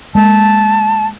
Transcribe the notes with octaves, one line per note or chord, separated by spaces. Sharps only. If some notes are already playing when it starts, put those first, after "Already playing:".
G#3 A#3 A5